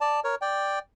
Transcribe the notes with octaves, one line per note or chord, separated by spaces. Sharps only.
D5 A5
A#4 C#5
D5 G5